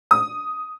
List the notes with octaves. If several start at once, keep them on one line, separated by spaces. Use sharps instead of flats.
D#6